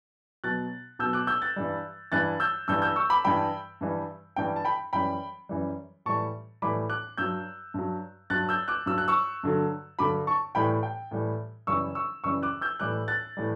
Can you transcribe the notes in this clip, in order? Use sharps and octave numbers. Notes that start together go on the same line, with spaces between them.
B2 F#3 F#6 A6
B2 F#3 E6 G6
D6 F#6
E6 G6
F#6 A6
G2 E3 G3
G2 E3 G3 F#6 A6
E6 G6
G2 E3 G3 E6 G6
E6 G6
C#6 E6
B5 D6
G2 E3 G3 G5 B5
G2 E3 G3
G2 E3 G3 G5
A5
G5 B5
F#2 E3 G3 G5 B5
F#2 E3 G3
A2 E3 G3 A5 C#6
A2 E3 G3 B5 D6
D6 F#6
G2 F#3 E6 G6
G2 F#3
G2 F#3 F#6 A6
E6 G6
D6 F#6
G2 F#3 E6
F#6
C#6 E6
G2 D3 F#3
G2 D3 F#3 B5 D6
A5 C#6
A2 E3 G3 G5 B5
G5
A2 E3 G3
F#2 C#3 E3 G3 C#6 E6
C#6 E6
F#2 C#3 E3 G3 C#6 E6
D6 F#6
E6 G6
A2 E3 G3 D6 F#6
F#6 A6
A2 E3 G3